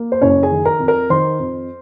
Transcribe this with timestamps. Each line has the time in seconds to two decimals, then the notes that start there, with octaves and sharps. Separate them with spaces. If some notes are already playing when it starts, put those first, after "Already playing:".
Already playing: A#3
0.12 C5
0.21 F#1 C#4 C#5
0.43 G#4 G#5
0.52 D#3
0.65 A#4 A#5
0.80 F2
0.88 A#4 A#5
1.10 D#3 C5 C6
1.40 F2